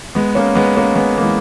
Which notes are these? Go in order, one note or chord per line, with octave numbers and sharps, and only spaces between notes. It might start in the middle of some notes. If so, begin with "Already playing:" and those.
G#3 B3
A#3 C#4
G#3 B3
A#3 C#4
G#3 B3
A#3
E3 G#3